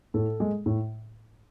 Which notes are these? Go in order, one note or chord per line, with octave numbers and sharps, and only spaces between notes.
A2 A4
G#3
A2